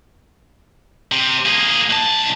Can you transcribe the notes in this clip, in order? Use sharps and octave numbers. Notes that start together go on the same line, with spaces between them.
C3
A#3 G#4
B1 A5